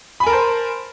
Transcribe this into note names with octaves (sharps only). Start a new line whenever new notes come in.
A#4 C5 G#5 A5 B5